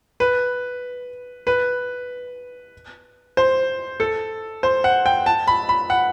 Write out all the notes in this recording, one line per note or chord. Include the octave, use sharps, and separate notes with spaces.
B4
B4
C5
A4
C5
F#5
G5
A5
B5
B5
F#5